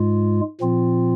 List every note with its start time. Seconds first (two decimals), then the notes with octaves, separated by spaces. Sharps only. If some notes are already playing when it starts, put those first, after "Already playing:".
Already playing: G#2 G#3 F4
0.60 A#2 F3 C4 F4